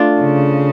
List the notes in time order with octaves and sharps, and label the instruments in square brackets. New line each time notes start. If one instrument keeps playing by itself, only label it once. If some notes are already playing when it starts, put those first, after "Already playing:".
Already playing: [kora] A3 D4 F4
[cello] C#3